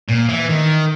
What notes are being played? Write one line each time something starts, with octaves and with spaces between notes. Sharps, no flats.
A#2
E3
D#3